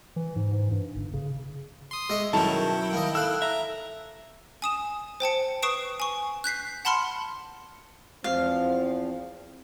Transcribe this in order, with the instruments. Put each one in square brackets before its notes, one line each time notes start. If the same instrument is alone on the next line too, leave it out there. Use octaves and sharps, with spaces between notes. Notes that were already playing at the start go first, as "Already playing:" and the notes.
[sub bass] E3
G#2
G#2
G2
G1
C#3
[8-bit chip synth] C6 D#6
[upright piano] G#3 [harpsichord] D#5 E5 C#6
[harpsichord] B1 F#2 [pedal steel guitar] D#3 F#3 [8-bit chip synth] E4 G5 [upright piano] A5
[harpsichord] A#3 D#5
[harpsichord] A4 F5 [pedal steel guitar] E6 F#6
[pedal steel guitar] E5 [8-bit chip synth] A#5
[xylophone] G#5 D#6 E7
C5 G5 A5 C#7
B4 C#6 D#6 C7 D7 E7
G#5 C#6
F#6 G6 B6 C7
F#5 A5 B5 C6 F6 C#7
[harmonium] E2 F3 [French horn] C4 [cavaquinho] F5